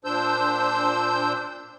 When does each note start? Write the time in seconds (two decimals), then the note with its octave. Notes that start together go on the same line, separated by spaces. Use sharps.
0.05 A#2 D4 C5 E6 G6